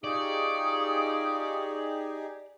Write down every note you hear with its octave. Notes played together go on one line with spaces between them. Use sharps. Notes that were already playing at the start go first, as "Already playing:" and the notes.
D#4 F4 G4 G#4 D5 C#6 D#6